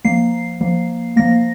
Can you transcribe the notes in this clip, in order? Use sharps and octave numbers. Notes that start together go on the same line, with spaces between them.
F3 A#3 C7
F3 A#3
F3 A#3 A#6